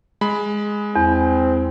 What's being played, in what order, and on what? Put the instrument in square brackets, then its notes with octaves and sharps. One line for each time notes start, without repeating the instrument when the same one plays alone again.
[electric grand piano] G#3 B5
[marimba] E2 [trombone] C4